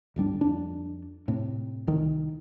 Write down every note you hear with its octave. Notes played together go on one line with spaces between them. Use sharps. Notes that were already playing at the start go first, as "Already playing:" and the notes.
D1 G1 G3 D4
F2 D4
A2 C3
C2 D#3